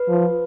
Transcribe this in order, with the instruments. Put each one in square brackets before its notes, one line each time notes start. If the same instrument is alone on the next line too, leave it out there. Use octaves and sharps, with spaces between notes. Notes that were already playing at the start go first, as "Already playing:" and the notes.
Already playing: [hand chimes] B4
[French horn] F3